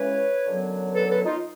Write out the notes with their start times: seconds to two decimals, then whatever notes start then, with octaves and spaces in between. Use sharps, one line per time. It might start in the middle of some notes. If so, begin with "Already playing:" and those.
Already playing: C#3 E3 G#3 C#4 B4 C#5
0.46 F#2 D3 F#3 B3
0.94 A4 B4
1.10 A4 B4
1.25 D#4 F4